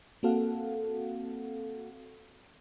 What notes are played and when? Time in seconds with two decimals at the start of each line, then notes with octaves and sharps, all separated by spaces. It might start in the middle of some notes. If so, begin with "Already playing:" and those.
0.23 A#3 C4 F#4 A4 F5 F#5